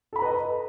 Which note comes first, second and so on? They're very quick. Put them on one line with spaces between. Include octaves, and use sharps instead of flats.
A4 B5 A#5 B4 D#5